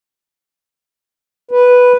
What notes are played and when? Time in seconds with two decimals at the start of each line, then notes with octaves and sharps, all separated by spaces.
1.51 B4